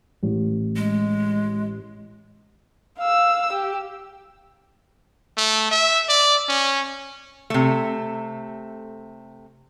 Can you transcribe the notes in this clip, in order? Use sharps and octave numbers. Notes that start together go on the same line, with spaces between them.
A1
G#3
F5 E6
G4
A3
E5
D5
C#4
C3 A3